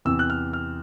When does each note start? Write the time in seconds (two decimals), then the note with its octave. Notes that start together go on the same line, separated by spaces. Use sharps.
0.05 E2 C3 E3 E6
0.19 F#6
0.30 F6
0.53 F6